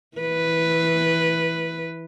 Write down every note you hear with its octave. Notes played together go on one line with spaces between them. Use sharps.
E3 B4